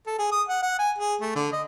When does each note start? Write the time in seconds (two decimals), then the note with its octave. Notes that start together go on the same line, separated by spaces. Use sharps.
0.07 A4
0.19 G#4
0.32 D#6
0.48 F#5
0.63 F#5
0.79 G#5
0.99 G#4
1.21 A3
1.36 D3
1.52 D#5